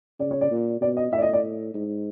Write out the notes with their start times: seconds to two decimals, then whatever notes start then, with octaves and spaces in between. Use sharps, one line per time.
0.19 C#3 D5
0.31 C#5
0.41 D5
0.51 A#2
0.81 B2 D5
0.97 D#5
1.12 A2 E5
1.18 D5
1.22 D#5
1.33 D5
1.74 G#2